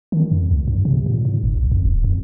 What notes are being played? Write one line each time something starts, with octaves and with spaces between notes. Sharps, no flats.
D#3
F2
C#2
G2
C3
A#2
G#2
G1
B1
F2
D1
F2